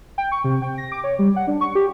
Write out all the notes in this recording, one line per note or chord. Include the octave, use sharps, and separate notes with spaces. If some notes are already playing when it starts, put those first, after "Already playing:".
G5
C#6
C3
G5
A#6
D6
C#5
G3
F#5
D4
C#6
G4